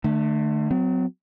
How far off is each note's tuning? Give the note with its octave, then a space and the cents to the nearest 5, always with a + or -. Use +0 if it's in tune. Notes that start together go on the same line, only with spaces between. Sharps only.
D3 +35 A3 +0
F#3 +0 C4 -40